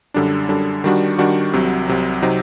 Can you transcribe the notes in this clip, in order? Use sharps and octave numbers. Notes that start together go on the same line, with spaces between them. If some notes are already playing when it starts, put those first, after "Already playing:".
F#2 D3 G3 D4
F#2 D3 G3 D4
D#3 G3 D4 F#4
D#3 G3 D4 F#4
C2 C3 F#3
C2 C3 F#3
C3 F#3 C4 D#4